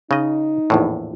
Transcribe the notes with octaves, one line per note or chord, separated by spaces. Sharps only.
C#3 D#4 D#5
A#1 E2 A2